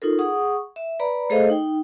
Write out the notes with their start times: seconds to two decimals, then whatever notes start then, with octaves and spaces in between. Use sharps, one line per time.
0.02 D#4 F4 A4 A#4
0.19 G#4 F#5 C#6 D#6
0.76 E5
1.00 B4 D5 A#5 B5
1.30 A3 G#4 A4 C5 D#5 F5
1.49 D#4 G5